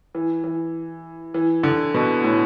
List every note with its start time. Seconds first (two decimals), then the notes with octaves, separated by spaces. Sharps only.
0.15 E3
0.44 E3
1.34 E3
1.63 D3
1.94 B2
2.24 A2